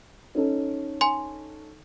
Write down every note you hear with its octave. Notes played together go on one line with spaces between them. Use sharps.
C#4 D#4 A4
G#5 C6